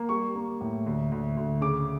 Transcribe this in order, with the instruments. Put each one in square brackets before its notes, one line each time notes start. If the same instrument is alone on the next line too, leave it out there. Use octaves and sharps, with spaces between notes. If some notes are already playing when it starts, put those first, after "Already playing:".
Already playing: [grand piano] A#3
G3 C#6
A#3
A2
D2
D2
D2
C#3 D6